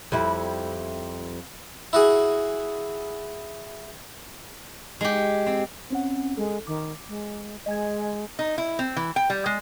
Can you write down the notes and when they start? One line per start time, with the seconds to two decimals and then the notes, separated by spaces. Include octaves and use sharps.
0.12 F2 G3 E4
1.93 E4 F#4 G#4
5.01 G#3 G4
5.47 C4
5.90 C4 C#4 F#5
6.37 G#3 A4
6.67 D#3 D6
7.08 G#3
7.66 G#3 D#5 G#5 G#6
8.39 D#4
8.58 E4
8.79 C4
8.97 E3
9.16 G5
9.30 G3
9.46 G#3